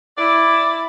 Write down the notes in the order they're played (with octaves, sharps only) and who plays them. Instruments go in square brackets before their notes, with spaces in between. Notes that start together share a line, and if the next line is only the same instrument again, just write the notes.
[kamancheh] E4 [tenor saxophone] D5